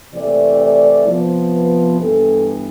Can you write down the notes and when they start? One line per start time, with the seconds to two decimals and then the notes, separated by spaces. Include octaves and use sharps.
0.13 C3 E3 A3 D5
0.60 D5
1.07 C3 F3 B3
1.53 B4
2.00 G2 E3 B3 A4